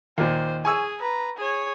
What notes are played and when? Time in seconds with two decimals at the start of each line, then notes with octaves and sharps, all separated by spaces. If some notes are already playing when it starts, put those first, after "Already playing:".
0.18 D#2 A#2 C5
0.65 G#4 G#5 C#6 E6
1.01 B4 A#5
1.37 G#4 C#5